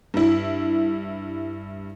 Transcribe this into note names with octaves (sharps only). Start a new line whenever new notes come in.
G2 E4